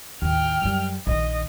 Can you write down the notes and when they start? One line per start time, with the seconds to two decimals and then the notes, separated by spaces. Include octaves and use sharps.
0.22 A1 D#2 G5 F6
0.62 F#2 G3
1.07 A#1 D#3 D#5